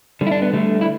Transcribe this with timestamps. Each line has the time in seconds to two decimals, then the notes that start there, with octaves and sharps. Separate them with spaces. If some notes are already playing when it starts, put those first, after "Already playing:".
0.21 D3 G3
0.27 E4
0.32 D4
0.42 B3
0.53 D3 G3 A3
0.81 E4